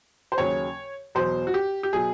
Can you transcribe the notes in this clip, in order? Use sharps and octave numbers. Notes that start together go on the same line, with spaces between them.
C5
D#2 C#3 F#3 C#5
E2 B2 F#3 C5
F#4
G4
G4
B2 F#3 G#4